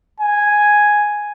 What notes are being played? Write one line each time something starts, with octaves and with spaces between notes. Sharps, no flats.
G#5